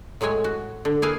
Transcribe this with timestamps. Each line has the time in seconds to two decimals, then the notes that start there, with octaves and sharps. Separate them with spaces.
0.21 A2 F#3 G#3 C#5 G#5
0.44 F#4
0.85 D3
1.02 A#3 E4 G#4 B4 F5 G#5